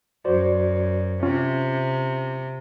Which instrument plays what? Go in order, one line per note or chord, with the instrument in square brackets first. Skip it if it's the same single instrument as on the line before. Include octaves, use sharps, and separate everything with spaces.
[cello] F#2 [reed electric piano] F#4 C5 D5
[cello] C3 [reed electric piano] C#4 F4